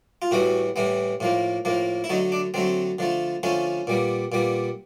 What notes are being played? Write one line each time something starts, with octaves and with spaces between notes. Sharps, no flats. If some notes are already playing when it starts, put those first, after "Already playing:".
F4
A2 E3 G3 B3 F#4
A2 E3 G3 B3
A2 F3 A#3
A2 F3 A#3
E4
D3 F#3 A3 D#4
D4
D3 F#3 A3 C4
D3 F3 A3
D3 F3 A3 C#4
A#2 G3 B3
A#2 G3 B3